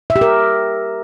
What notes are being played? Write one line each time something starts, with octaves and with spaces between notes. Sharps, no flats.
E5
G4
A#4